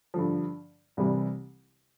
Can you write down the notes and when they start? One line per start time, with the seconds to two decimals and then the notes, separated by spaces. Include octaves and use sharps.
0.14 G2 D3 F3
0.97 C2 C3 E3 G3